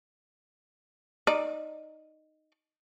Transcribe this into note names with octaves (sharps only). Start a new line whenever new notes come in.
D#4 D5